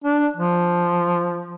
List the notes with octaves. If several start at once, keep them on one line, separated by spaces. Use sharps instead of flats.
D4
F3